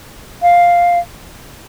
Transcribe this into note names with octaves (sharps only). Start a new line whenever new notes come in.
F5